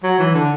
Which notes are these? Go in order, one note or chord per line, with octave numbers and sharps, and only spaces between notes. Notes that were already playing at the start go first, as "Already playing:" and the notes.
F#3
E3
D3